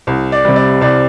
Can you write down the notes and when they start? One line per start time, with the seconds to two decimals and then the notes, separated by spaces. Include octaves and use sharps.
0.07 C2
0.32 D5
0.45 C3 G3
0.56 D5
0.81 C2 D5